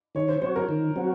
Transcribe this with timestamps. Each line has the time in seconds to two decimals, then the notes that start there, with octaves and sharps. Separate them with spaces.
0.15 D#3 C#5
0.29 C5
0.41 F#3 C4 F#4 C5 C#5
0.56 A#4
0.69 D#3
0.96 F#3 C4 F#4